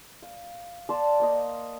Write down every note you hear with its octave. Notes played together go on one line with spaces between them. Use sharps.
F5
D5 F5 A5 C6
A#3 C5 D#5